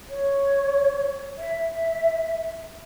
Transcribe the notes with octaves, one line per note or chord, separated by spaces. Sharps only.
C#5
E5